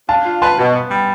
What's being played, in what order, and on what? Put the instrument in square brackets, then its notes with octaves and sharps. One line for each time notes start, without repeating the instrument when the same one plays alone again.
[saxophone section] D4 [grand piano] F5 A5
[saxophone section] F4
[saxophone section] B4 [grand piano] A5 C6
[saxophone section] B2
B3
G3